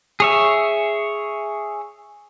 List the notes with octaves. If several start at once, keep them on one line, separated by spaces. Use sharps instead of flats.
G#4 C#5 E5